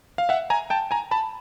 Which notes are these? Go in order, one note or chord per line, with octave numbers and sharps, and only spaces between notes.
F5
E5 F#5
G#5 A#5
G5 A5
G#5 A#5
A5 B5